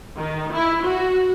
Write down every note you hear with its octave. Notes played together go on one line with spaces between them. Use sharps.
D#3
E4
F#4